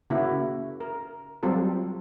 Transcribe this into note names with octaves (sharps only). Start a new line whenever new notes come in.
C#3 A#3 E4 F#4
A#4
F#3 G3 C4 F4 A4